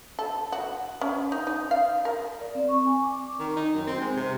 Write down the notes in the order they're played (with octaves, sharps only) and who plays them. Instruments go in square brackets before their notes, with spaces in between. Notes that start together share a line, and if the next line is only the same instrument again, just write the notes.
[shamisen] A4
F#4
C#4
D#4
D#4
F5
A#4
[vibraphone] D5
C4
C#6
G#5
D6
[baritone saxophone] D#3
D#4
F#2
C4
G#3
C3